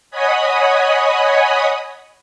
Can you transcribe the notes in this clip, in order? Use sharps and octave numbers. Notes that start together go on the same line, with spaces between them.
C#5 D#5 F#5 G#5 B5 D#6